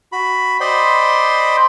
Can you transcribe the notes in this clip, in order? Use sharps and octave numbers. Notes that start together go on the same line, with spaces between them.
F#4 B5
C5 D5 D#5 G5 B5 C6